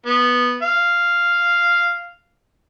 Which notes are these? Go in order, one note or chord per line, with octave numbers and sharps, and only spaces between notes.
B3
F5